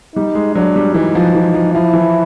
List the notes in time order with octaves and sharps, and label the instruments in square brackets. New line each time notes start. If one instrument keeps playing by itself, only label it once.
[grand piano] G3 [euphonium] D#4
[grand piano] G#3
[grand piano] F#3 [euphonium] D4
[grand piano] G3
[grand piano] E3 [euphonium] D#4
[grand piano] F3
E3
F3
[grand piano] F3 [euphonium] E4
[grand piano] E3